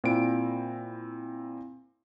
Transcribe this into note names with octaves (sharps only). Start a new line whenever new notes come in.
A#2 C4 E4 D7